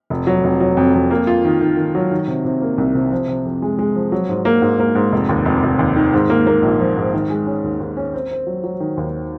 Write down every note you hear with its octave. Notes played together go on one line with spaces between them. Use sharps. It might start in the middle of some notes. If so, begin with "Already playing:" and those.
F1
F#3
F1
F#3
F2
F2
A#3
F4
D#3
D#3
D#3
F#3
D#3
C3
C3
A#3
C2
C3
F3
C3
F2
G#3
G#3
F3
F#3
G#2
A#3
G#2
A#3
G#2
F1
D#2
F1
F1
D#2
D#3
G#2
A#3
A#3
A#1
F3
G#2
D#3
G#3
C#4
D#2
D#2
C#4
C4
C4
F#3
F#3
D#3
D#2